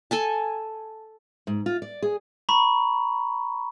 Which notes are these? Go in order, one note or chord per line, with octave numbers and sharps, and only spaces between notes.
A4 G#5 A5
G#2
F4
D5
G#4
A#5 B5 C#6